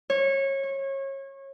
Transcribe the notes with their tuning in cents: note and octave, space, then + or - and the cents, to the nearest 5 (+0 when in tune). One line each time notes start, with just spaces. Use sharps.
C#5 -25
C#5 -30